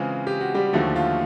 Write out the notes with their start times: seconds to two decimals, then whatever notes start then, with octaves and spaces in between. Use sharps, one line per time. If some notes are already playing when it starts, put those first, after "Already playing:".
Already playing: C#3 E3 G#3 C4 F4
0.27 G4
0.41 F#4
0.55 G3 G4
0.73 D#2 D3 F3 F#3 A3 F#4
0.96 F4